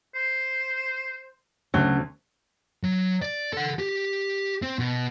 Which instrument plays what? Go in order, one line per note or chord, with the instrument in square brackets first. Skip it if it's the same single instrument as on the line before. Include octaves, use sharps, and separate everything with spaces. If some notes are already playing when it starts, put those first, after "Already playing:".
[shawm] C5
[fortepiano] D2 [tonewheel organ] C#3 C#4 [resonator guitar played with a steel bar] F#3
[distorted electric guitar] F#3
D5
A4 F#5
G4
C4
B2